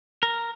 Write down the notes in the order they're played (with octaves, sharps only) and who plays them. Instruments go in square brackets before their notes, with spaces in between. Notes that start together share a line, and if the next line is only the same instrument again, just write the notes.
[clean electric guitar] A#4